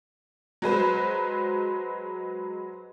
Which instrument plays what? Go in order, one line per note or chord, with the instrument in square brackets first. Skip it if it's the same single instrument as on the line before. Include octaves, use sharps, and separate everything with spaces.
[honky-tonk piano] F#3 G#3 B4 C5